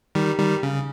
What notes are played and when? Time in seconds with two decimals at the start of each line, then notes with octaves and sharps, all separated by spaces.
0.15 D#3 G3
0.39 D#3 G3
0.63 C#3